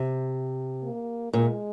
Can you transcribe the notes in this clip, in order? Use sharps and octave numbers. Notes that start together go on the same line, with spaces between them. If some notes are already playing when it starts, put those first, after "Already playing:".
Already playing: C3
A#3
A#2 G#3